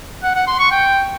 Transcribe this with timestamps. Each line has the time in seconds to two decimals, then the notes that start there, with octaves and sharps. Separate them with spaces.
0.23 F#5
0.35 F#5
0.47 C6
0.59 C#6
0.71 G5